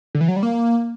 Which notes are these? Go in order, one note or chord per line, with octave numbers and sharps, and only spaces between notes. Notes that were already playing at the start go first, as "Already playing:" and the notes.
D3
E3
F#3
G3
A#3